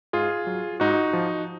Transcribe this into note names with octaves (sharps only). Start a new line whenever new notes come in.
G#2 F4 G#4
F#3
G#2 D#4 F#4
F3